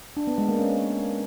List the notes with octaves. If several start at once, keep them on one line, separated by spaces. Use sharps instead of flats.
D4
B3
G#3
A#3
C#4